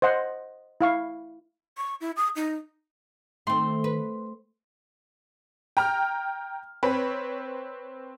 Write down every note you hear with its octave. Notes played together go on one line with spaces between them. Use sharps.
C5 D#5 F#5 C6
E4 F5 C#6
C#6
E4
D#6
D#4
D#3 A3 C4 C6
B4
G5 A#5 F6
C4 B4 C#5